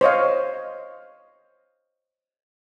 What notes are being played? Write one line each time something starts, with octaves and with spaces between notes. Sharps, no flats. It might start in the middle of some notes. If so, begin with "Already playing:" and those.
C5 C#5 D#5 F5